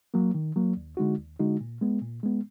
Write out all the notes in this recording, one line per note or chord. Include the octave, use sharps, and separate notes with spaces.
F#3 A#3
D#3
F#3 A#3
D#2
D3 G#3 D#4 F#4
D#2
D3 G#3 D#4 F#4
A#2
G#3 B3
A#2
G#3 B3